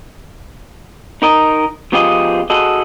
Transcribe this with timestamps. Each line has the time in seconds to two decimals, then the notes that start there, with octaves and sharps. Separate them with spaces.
1.22 D#4 A#4 D#5
1.92 F3 B3 F4 G4 G#4 D#5
2.50 F#4 G#4 A4 D#5